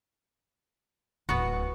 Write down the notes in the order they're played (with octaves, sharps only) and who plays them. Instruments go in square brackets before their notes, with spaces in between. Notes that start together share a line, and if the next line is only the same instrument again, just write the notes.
[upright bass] D1 [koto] B3 F#4